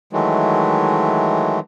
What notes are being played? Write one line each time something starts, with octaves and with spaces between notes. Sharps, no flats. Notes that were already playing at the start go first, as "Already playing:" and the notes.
D#3 E3 F#3 G#3 A3